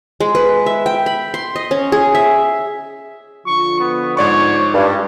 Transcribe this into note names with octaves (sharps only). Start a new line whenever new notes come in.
G#3
B4
E5
G5
B5
C6
D#5
C#4
G#4
E5
D3 F3 F4 C#6
B3
G#2 C#5 D5 C#6
G2 G3